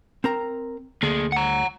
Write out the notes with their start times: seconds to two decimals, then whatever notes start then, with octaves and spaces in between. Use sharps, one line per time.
0.24 C4 A#4 A#5
1.03 D2 A#3 G#4
1.32 F#5 A#5